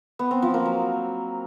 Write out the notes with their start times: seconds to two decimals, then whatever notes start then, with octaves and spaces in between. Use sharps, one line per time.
0.19 B3
0.31 C4
0.42 F3
0.54 A#3
0.66 F#3